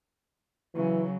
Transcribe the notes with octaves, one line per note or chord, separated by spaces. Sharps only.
C#3 E3 F#3